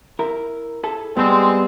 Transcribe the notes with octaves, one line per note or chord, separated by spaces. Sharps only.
E4 A#4
E4 G#4 A4
G3 G#3 B3 C4